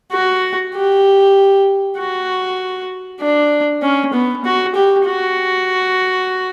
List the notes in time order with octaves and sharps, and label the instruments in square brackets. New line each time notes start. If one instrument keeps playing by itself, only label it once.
[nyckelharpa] F#4
G4
F#4
D4
C#4
B3
F#4
G4
F#4